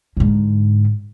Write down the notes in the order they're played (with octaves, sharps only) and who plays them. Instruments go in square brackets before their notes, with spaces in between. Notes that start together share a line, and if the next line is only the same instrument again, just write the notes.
[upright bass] G#2 D3